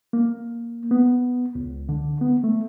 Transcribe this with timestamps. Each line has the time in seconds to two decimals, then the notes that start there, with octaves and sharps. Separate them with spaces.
0.13 A#3
0.91 B3
1.55 C#2
1.89 D3
2.21 B3
2.44 A3